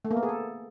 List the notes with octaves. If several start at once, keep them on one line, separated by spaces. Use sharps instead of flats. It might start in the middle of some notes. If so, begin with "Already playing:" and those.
A3
A#3
B3
G#4
A4